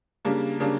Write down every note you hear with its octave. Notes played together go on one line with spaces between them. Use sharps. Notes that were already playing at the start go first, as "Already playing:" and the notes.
C#3 G3 A#3 D4
C#3 G3 A#3 D4